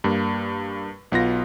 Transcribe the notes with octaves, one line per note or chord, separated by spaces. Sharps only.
G2 A#3
B1 B3 F4 A#6